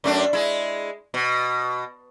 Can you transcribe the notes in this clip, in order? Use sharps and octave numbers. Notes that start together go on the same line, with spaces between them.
F#2 A3 D4
G#3 E4
B2